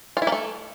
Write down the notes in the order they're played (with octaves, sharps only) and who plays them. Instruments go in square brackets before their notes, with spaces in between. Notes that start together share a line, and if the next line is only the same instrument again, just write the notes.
[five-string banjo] F4
E4
A#3
A3